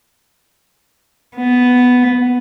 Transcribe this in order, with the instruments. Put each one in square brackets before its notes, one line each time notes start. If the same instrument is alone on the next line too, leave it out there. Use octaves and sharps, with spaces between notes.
[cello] B3